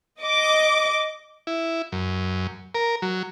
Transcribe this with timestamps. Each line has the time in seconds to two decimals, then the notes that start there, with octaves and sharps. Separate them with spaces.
0.22 D#5 D6
1.47 E4
1.92 F#2
2.75 A#4
3.02 F#3